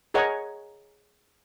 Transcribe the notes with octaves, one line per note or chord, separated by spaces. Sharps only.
G#4 A#4 C#5 D#5 F#5 G#5